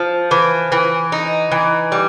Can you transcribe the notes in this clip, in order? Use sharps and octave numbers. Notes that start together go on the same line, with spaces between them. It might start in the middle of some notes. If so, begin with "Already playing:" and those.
Already playing: F3
E3
E3
D#4
E3
G3